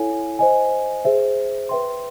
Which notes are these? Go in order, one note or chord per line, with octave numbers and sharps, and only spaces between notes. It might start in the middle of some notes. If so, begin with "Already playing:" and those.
Already playing: E4 A4 C#5 F5 G#5
C5 D#5 G#5
G#4 C5 E5
B4 E5 G5 C6